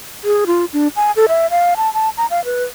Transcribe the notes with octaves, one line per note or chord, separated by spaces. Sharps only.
G#4
F4
D4
G#5
A4
E5
F5
A5
A5
A#5
F5
B4